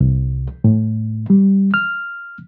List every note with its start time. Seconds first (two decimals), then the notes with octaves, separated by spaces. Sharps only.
0.01 C2
0.64 A2
1.30 G3
1.74 F6